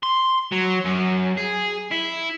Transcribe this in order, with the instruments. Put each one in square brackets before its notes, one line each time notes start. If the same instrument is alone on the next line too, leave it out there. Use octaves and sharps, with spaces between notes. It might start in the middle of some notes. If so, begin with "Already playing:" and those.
[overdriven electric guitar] C6
F#3
F#2
G#4
E4